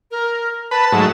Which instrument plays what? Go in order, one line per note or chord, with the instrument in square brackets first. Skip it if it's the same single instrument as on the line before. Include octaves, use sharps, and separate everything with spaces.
[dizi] A#4
[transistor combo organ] B4 [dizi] A5
[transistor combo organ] G#2 F#3 A3